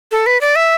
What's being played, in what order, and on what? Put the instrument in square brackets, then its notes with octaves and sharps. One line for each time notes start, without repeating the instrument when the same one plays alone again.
[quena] A4
B4
D5
E5